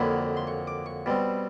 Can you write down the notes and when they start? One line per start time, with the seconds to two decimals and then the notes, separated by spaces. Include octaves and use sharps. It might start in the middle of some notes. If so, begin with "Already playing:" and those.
Already playing: F2 D3 F#3 A#3 D#4 B5
0.37 C6
0.47 C#6
0.67 D6
0.86 C#6
1.06 B2 G3 C4